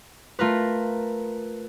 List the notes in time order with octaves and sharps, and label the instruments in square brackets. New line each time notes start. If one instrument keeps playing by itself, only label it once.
[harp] A3 F4 A#4 B4